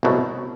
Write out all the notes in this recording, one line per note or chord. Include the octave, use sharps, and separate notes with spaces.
C2 B2 F#3 A3